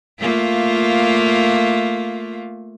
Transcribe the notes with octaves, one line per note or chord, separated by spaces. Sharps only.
A3 A#3 F4